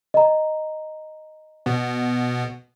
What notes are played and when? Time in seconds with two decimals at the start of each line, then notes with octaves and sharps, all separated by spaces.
0.14 D#5 A#5
1.66 B2 B3